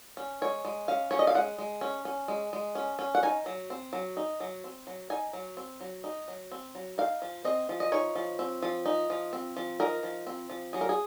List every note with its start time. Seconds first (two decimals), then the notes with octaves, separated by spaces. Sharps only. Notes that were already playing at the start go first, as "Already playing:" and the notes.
0.17 C#4
0.42 G#3 C#5
0.65 G#3
0.88 C#4 F5
1.11 C#4 C#5
1.19 D#5
1.27 F5
1.34 G#3 F#5
1.58 G#3
1.81 C#4
2.05 C#4
2.28 G#3
2.53 G#3
2.75 C#4
2.99 C#4
3.15 F#5
3.23 D#4 G#5
3.46 F#3
3.70 C4
3.93 F#3
4.17 D#4
4.40 F#3
4.64 C4
4.87 F#3
5.10 D#4 G#5
5.33 F#3
5.57 C4
5.80 F#3
6.04 D#4
6.28 F#3
6.51 C4
6.75 F#3
6.98 D#4 F5
7.22 F3
7.44 C4 D#5
7.69 F3
7.80 D#5
7.92 D#4 C#5
8.15 F3
8.39 C4
8.62 F3
8.86 D#4
9.10 F3
9.33 C4
9.57 F3
9.80 D#4 A#4
10.03 F3
10.27 C4
10.50 F3
10.73 F#3 G#4
10.81 A#4
10.89 G#4